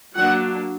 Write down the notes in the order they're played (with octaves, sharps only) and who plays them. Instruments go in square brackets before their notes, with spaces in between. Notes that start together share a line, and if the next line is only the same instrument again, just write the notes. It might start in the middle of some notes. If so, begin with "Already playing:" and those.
[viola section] F#3 A#3 D4 F#5